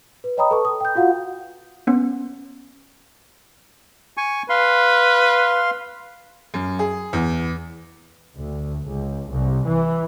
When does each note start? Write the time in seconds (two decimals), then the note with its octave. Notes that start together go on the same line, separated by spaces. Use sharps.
0.24 B4
0.37 C#5 D#5 G5 A#5 B5 D#6
0.51 A4 B4 A5 C#6
0.65 D#6
0.80 G5 G6
0.95 F4 F#4 F5 F#5
1.87 B3 C#4
4.17 G#5 C#6
4.49 B4 F5 C6
6.54 F#2
6.79 G#4
7.13 E2
8.39 D2
8.86 C#2
9.31 C2
9.67 E3